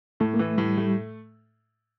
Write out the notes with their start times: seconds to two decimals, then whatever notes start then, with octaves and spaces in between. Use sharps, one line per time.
0.20 A2 A3
0.34 A#3
0.39 E3 A3
0.58 A2 G3
0.77 G3 A3